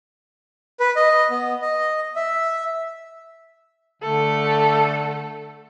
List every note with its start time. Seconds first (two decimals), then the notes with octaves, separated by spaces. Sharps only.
0.80 B4
0.96 D#5
1.30 B3
1.62 D#5
2.16 E5
4.02 D3 A3 A4